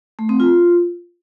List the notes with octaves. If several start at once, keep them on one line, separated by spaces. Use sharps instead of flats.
A3
C4
F4